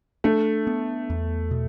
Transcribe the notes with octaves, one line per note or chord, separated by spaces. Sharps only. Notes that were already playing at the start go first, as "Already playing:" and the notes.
A3 D4
B3
E2
B2